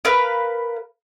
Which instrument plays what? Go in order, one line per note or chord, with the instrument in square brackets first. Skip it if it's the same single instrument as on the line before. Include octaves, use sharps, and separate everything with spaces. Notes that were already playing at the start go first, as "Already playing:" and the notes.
[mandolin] A#4 B4 F5